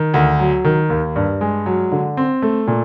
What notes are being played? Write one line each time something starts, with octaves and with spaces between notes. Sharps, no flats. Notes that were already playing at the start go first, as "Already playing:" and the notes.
Already playing: D#3
D2
F#3
D#3
D#2
G2
G#3
F#3
D3
C4
A3
A#2